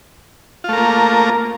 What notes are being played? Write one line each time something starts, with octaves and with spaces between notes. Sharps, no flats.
A3 A#3 F4 A#4